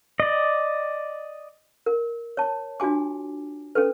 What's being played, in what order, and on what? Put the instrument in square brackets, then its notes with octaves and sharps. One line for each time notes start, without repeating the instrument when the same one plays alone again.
[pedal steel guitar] D5 D#5
[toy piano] A#4
C#5 A5
D4 F4 F#4 G#5 D6
C#4 A4 B4